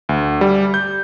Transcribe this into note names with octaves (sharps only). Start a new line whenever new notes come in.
D2
G3
G6